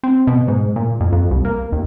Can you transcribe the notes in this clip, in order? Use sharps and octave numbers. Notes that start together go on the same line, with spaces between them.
C4
B2
G#2
A#2
F2
F2
C2
A#3
D#2